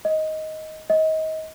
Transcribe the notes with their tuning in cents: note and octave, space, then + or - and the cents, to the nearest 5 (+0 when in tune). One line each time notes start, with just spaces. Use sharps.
D#5 +10
D#5 +30